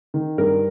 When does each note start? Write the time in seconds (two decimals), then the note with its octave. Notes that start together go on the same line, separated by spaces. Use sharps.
0.14 D#3
0.38 G2 A#4